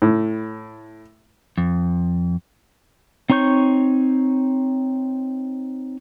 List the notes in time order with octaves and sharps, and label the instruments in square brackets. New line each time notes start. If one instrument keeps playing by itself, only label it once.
[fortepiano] A2
[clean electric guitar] F2
[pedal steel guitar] C4 D#4 C#5 C#6 G6